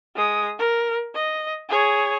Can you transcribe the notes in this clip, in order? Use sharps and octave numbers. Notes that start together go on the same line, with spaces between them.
G#3 D#6
A#4
D#5
G#4 C#5